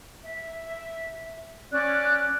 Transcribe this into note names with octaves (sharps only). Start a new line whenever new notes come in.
E5
C#4 D5 F#6